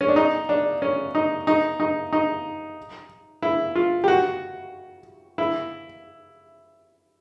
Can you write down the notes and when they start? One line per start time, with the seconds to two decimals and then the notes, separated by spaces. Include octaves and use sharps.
0.01 C#4
0.08 D4
0.16 D#4
0.49 D4
0.82 C#4
1.15 D#4
1.47 D#4
1.80 D#4
2.13 D#4
3.42 E4
3.75 F4
4.04 G4
4.08 F#4
5.38 E4